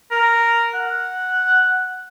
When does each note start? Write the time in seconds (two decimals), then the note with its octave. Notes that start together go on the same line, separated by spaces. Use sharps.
0.11 A#4
0.74 F#5